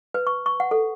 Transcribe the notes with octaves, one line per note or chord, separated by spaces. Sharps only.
B4
C#6
C#6
F#5
A4